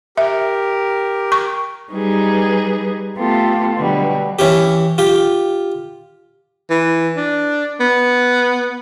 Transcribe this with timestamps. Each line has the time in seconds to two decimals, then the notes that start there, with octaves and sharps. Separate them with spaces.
0.18 G4 A#4 E5
1.32 C#6
1.91 F#3 G3 D#4 G#4 B4
3.16 A3 B3 F4 G4 A4
3.76 B2 D3 F#3 G3
4.39 E3 C#4 G4
4.98 F4 G4
6.70 E3
7.17 D4
7.80 B3